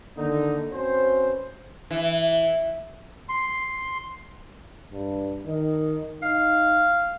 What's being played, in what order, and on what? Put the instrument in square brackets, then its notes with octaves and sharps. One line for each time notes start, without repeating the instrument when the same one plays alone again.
[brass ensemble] D3 D#3 A#3 D#4
C4 C#4 F#4 B4 C5
[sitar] E3
[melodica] C6
[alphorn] G2
D#3
[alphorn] D#4 [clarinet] F5